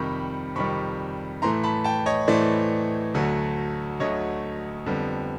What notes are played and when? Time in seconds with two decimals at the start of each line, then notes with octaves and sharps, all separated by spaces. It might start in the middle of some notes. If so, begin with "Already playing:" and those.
Already playing: F2 C3 D#3 G3 B5 C#6
0.55 F2 C3 D#3 G3 B5 C#6
1.42 A2 E3 A3 A#5 C6
1.64 A5 B5
1.84 G5 A5
2.06 C#5 D#5
2.27 A2 E3 A3 C5 D5
3.14 D2 D3 F#3 A3
4.00 D2 D3 F#3 A3 C#5 D#5
4.86 F2 D3 G3 B3